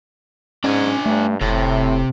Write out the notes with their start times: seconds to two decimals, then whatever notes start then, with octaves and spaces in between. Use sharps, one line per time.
0.64 G#2 C#4 D4 G#5
1.06 G2 A3
1.41 F1 A2 C3